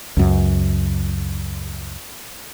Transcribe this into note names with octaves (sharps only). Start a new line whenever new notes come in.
C#2 F#2